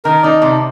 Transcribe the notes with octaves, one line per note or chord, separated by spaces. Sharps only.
D#3 A#4
D#4 D5
C3 D5